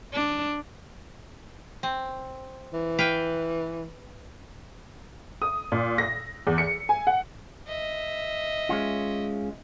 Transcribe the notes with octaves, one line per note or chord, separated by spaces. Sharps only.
D4
C4
E3
B4 F5 G5
D#6
A#2
A#6
E2
C#7
G#5
F#5
D#5 E5
G#3 C#4 F4